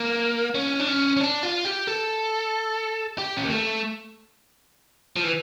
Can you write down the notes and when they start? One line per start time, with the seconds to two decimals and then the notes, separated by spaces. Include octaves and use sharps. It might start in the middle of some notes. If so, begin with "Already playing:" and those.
Already playing: A#3
0.55 C#4
0.80 D4
0.88 C#4
1.17 C#4
1.21 D4
1.43 F4
1.65 G4
1.87 A4
3.18 G4
3.37 C#4
3.44 A#3
3.52 A3
5.16 F3
5.24 E3